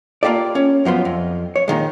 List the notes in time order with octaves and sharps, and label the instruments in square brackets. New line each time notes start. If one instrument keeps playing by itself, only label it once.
[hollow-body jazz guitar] A#3 F4 G4 A4 D5
C#4
F#2 F3 B3 C6
F2
C#5
A#2 D#3 G#3